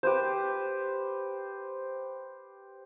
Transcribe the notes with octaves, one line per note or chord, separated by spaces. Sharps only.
G4 B4 C5